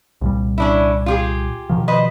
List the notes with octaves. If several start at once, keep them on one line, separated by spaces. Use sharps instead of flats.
C2 A#2 G3
C#4 D4 E4
F4 G4 G#4
B2 D#3 F3
B4 C5 D#5